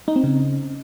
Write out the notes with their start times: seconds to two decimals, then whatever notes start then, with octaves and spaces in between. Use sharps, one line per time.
0.08 D#4
0.16 C4
0.24 C#3